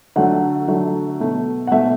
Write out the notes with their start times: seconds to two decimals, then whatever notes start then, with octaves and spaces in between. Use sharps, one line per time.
0.16 D3 F#3 A3 F#5
0.68 D3 F#3 A3
1.20 B2 A3
1.67 F#5
1.72 B2 A3 E5